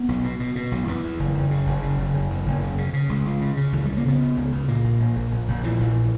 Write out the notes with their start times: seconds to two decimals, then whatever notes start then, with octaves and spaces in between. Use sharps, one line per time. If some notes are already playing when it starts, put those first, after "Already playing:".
Already playing: B3
0.09 B1
0.24 B2
0.40 B2
0.56 B2
0.72 B1
0.87 E2 E3
1.03 E2
1.19 F#1
1.35 F#1
1.51 C#3
1.66 F#1
1.82 C#3
1.98 F#1
2.14 F#1
2.30 E2
2.46 F#1
2.62 C#3
2.78 C#3
2.93 C#3
3.09 C#2
3.25 C#2
3.41 C#3
3.57 C#3
3.73 C#2 E3
3.85 G3
3.89 C#3
3.97 A#3
4.05 C#3 B3
4.20 C#3
4.37 C#2
4.52 C#3
4.68 A#2 A#3
4.84 A#1
5.00 A#1
5.16 A#1
5.32 A#1
5.48 A#1
5.63 A#2 E3
5.80 A#1
5.95 A#2